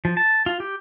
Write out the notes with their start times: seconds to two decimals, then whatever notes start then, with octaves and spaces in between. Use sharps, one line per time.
0.05 F3
0.17 A5
0.46 F4
0.60 G4